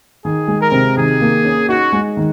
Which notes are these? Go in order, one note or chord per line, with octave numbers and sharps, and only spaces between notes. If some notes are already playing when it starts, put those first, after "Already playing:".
D#3 G#4
G#3
A#4
C3
D#3 G#4
A#3
C#4
D#4 F#4
G#3
D#3